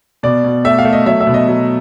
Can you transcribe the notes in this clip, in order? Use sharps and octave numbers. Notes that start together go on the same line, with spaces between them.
B2 D5
B2
A3 E5
F5
A3
D#5
F#3 E5
E5
B2
D#5
F#3